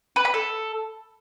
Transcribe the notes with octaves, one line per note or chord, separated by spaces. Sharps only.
B4
B5
A4